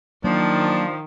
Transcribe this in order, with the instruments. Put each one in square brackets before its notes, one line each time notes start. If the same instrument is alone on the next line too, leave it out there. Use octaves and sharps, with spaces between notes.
[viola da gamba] D#3 [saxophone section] F3 [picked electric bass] F#3 A#3 [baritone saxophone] D4